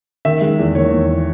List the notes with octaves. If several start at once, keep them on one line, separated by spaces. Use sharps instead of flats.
D#3 E5
G#3
E2
D#3 C#5
E2